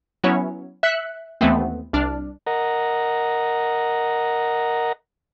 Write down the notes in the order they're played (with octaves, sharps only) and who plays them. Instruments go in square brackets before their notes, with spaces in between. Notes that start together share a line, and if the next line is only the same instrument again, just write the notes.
[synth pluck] F#3 B3 C#4 E4 C#5
E5 F#6 B6 C#7
D#2 E3 A3 B3 C4
C2 D4 F6
[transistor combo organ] A#4 D#5 F#5 A#5